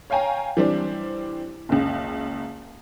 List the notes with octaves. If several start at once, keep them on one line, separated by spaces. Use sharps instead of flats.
C#5 F5 G5 G#5 A#5
E3 G3 C4 D4
F#1 C#2